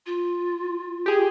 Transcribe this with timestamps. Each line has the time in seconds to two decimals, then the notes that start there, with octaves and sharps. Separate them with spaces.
0.06 F4
1.06 G4 G#4